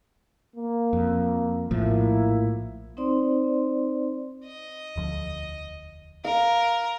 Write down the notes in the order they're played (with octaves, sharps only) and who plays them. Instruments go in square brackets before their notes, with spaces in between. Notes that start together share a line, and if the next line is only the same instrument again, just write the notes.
[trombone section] A#3
[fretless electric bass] F2
[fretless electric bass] A#1 A2 F3 [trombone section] A#3 E4
[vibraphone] C4 D#4 C5 D5 C6
[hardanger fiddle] D#5
[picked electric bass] E1 D2 F3
[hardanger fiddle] A#4 [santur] F5